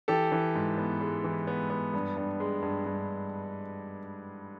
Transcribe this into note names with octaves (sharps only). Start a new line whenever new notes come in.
E3 G4 A4
E3
G#2
B3
G#3
E3
B3
B3
G2
G2
G#3
G2
G2